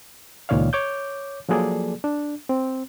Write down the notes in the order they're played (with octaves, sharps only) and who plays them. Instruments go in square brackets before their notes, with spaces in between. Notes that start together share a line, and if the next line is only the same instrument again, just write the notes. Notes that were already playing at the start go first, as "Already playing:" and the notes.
[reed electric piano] C#2 A#2 D#3 C#5 D5 F5
C#5 D6 G6
F3 F#3 A#3 G#4 A4 D5
D4
C4